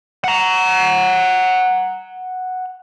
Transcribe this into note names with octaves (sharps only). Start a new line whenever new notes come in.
F#5 A#5